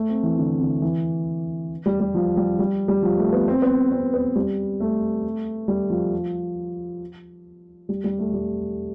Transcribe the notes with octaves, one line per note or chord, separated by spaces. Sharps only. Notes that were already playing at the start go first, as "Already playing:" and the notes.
Already playing: A3
C4
E3
D3
D3
E3
G3
G3
F3
G3
G3
G3
F3
A3
B3
C4
B3
C4
B3
G3
A3
G3
F3
G3
G3
A3
G3